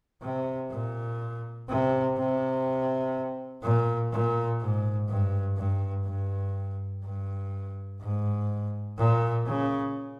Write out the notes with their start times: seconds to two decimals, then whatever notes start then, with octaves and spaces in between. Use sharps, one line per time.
0.22 C3
0.71 A#2
1.69 C3
2.18 C3
3.62 A#2
4.12 A#2
4.61 G#2
5.09 G2
5.57 G2
6.06 G2
7.04 G2
8.01 G#2
8.98 A#2
9.47 C#3